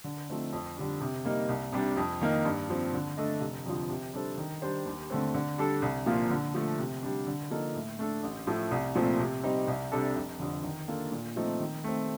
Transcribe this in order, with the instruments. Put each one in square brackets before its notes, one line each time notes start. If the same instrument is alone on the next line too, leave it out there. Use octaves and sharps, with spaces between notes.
[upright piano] D3
F3 A3 C4 D#4
F2
D3 G3 D4
C3
G3 A#3 D#4
C2
C3 G3 D4
F2
D#3 A#3 D#4
G2
F3 C4
D3
A3 D4 A4 D#5
F1
F2 D3 F3
C3
G3 D4 A4 C5
D#3
G3 D4 G4 C5
D#2
D3 A3 C4
D3
G3 D4 A4
C2
A#2 F3 A#3 F4
D3
F3 A3
C3
G3 D4
D3
F3 A#3 D#4 A4
A2
A3 D4 A4
A1
A2 F3 A3
C2
A#2 F3 A3 C4
C3
G3 C4 D#4
C2
C3 G3 D4 A4
F1
F2 D3
D#3
A#3 D4 F4 A4
A#2
F3 A3 C4 D#4
D#3
A3 C4